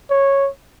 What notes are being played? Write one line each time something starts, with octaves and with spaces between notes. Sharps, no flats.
C#5